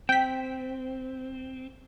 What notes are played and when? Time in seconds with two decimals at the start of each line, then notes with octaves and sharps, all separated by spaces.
0.09 C4 G5 B6